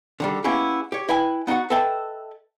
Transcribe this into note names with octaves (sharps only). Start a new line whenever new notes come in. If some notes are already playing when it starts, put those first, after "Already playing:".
D3 D#3 G3
A#3 B3 C#4 E4 G4 G#4
G4 C#5
E4 B4 G5 G#5
B3 D#4 E4 F#4 F#5
A4 B4 D#5 E5 G5 A5